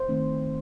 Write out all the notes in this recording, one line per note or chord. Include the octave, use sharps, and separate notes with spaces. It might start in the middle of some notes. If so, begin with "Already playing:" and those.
Already playing: C5
D#3 A3 C4 D#4